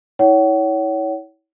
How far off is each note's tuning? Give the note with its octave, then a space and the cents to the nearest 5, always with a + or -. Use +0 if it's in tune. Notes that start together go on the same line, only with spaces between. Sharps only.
E4 -30 C#5 +20 F#5 +35